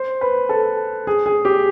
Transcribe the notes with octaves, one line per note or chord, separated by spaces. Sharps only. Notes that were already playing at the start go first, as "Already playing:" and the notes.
Already playing: C5
B4
A4
G#4
G#4
G4